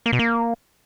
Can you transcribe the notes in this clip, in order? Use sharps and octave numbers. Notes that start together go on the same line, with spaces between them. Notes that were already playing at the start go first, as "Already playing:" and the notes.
A#3
B2
A#3